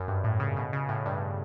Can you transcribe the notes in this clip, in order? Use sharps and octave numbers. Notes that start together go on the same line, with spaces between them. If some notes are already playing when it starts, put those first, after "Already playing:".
Already playing: F#2
G2
A2
C#3
B2
C#3
A2
G2